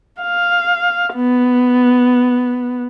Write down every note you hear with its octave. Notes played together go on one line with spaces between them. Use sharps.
F5
B3